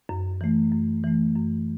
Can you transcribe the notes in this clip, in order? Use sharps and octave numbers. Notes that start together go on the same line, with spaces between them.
F#2
E3 A3
F#2
E3 A3
F#2